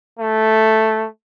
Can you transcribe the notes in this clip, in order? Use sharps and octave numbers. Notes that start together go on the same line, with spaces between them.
A3